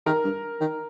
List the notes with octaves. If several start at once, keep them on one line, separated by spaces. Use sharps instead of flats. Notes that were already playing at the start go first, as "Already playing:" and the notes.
D#3 A#4
G2
D#3